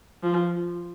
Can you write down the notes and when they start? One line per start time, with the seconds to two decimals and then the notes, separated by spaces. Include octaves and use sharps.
0.23 F3